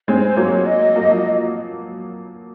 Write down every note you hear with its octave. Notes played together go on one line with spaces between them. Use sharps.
G#3 C4 C5 C#5
F#3 A#3 C#5
D#5
F#3 A#3
F3